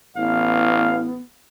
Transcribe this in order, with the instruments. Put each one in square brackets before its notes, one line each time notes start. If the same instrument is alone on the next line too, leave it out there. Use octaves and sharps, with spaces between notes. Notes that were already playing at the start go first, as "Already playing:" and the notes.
[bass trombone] A1 [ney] B3 [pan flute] E4 [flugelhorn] F5